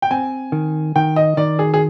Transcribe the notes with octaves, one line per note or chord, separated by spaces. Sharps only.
G5
C4 G#5
D#3
D#3 G5
D#5
D#3 D5
G#4
G#4